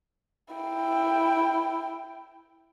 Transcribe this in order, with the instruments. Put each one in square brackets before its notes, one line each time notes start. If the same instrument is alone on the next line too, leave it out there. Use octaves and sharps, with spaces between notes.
[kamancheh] E4 G5